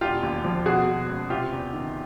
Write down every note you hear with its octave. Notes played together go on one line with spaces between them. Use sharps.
E1 F4 G4
D#2
F3
B2 F#4 G#4
B2
C#2
C3 F4 G4
E2
D#3